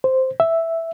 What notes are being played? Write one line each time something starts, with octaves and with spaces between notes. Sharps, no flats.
C5
E5